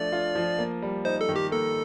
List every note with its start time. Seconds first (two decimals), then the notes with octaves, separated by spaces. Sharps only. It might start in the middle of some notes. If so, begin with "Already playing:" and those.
Already playing: F3 A3 D4 F4 D5
0.12 F4
0.35 F3
0.58 A#3
0.82 G3
1.05 D#4 C5
1.21 A4
1.29 D#3
1.36 G4
1.51 A#3 A4